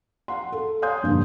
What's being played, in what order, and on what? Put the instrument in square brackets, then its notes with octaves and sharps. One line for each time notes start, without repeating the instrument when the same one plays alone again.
[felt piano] F5 F#5 C6
A4
C#5 F5 G#5 C6 D#6 G6
F1 G2 A#2 D3